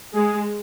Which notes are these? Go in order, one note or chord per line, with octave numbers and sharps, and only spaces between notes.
G#3 G#4